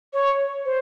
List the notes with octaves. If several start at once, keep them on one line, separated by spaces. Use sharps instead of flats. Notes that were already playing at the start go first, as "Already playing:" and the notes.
C#5
C5